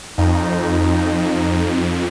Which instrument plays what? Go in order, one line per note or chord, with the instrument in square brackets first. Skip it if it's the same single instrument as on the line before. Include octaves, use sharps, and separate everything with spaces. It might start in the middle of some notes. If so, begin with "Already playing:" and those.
[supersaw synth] F2 [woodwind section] D#4